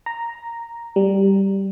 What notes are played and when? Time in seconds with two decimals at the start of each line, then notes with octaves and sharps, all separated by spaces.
0.06 A#5
0.96 G3